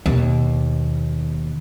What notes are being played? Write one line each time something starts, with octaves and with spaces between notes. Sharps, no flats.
D#2 B2